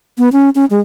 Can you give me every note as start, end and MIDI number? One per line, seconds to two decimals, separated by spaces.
0.18 0.29 59
0.33 0.50 61
0.55 0.65 61
0.70 0.80 56